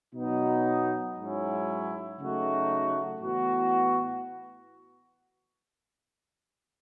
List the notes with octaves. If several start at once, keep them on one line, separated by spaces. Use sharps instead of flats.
B2 F#3 B3 D#4
G#2 F#3 C#4 E4
C#3 F#3 A3 D#4 F#4
A2 E3 B3 F#4